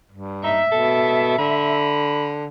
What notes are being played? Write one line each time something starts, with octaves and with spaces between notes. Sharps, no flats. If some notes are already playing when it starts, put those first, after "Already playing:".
G2
D#4 E5
B2 A4
D3 B5